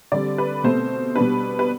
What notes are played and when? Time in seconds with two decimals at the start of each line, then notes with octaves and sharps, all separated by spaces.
0.12 D3 G3 C4 D5
0.38 B4
0.64 B2 A3 C4 C5
1.16 B2 G3 D4 B4
1.59 B4